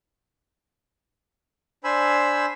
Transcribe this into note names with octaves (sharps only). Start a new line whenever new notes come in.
D4 C5 G#5 B5 E6